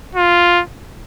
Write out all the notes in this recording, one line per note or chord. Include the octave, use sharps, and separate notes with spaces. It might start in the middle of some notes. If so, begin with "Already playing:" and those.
F4